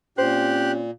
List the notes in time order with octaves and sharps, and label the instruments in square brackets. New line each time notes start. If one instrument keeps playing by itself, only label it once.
[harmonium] A#2 [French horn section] C4 C#4 [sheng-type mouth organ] G4 F#6 [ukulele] C5